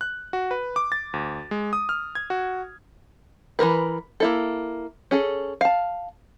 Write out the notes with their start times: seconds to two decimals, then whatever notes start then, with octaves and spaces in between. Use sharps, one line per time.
0.01 F#6
0.33 F#4
0.51 B4
0.76 D6
0.92 A6
1.13 D2
1.51 G#3
1.73 D#6
1.89 F6
2.15 G#6
2.30 F#4
3.59 E3 F#3 A#4 B4
4.20 A#3 E4 A4
5.11 C#4 G#4 A4
5.61 F5 A5